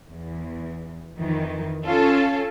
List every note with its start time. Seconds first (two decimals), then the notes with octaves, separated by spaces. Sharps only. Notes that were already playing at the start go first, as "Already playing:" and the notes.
0.11 E2
1.17 F2 D#3 E3
1.85 C#4 F4 A4